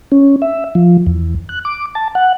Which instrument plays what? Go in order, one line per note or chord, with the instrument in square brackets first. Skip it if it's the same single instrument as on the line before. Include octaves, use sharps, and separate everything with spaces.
[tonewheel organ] C#4
E5
F3
E2
F#6
D6
A5
F#5